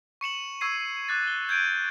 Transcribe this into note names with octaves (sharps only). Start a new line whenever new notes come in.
C#6 C#7 E7 F#7
C#6 E6 G#6 C7 D#7
D6 F#6 A6 C7
G7
G6 G#6 D7 D#7